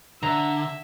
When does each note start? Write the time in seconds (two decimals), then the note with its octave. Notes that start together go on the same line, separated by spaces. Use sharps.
0.23 D3 E5 A#5